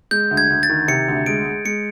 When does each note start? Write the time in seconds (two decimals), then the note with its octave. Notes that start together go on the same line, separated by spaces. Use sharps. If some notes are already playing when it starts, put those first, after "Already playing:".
0.11 G#3 G6
0.31 D2
0.37 G#6
0.50 D2
0.63 A6
0.69 D#3
0.88 C3 C#7
1.08 D2
1.26 G#3 D7
1.45 G#3
1.65 G#3 C#7